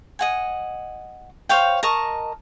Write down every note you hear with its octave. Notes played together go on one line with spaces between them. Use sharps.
D#5 F#5 G#5
C5 C#5 F5 G5
A#4 D#5 A5 C#6